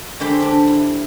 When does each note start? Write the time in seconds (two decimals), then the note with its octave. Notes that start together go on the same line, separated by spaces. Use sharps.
0.20 D3 G#3 G4 C5 B5
0.40 D4 G4
0.67 E4